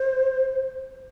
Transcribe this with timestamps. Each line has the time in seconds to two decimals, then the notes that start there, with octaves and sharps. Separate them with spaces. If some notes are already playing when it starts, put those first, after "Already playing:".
Already playing: C5